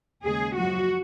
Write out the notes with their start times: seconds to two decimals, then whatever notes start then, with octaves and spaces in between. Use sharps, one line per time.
0.24 D#2 C#3 G#3 G#4
0.56 F#2 F3 G#3 F#4